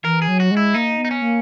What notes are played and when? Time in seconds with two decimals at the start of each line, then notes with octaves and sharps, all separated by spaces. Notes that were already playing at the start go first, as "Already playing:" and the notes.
0.04 E3 A#4
0.22 G#4
0.28 F#3
0.40 F#4
0.51 G#3
0.57 E4
0.74 A#3 D#4
0.98 B3
1.05 D#4
1.11 C#4
1.22 A#3